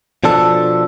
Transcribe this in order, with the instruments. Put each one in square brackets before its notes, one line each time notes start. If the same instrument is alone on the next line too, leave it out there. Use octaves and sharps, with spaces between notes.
[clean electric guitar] B2 F3 D4 A4